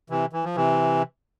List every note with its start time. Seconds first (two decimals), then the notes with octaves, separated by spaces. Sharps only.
0.10 C3 E3
0.33 E3
0.44 F3
0.56 C3 E3